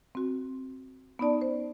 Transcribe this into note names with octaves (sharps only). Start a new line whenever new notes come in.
C4 F#4
B3 C#4 D#4 D5 A5
C5